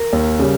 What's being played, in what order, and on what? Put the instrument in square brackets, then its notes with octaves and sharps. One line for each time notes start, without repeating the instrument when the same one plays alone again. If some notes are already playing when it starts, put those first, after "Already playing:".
Already playing: [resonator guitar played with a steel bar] A#4
[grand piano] D#2
C#3 G3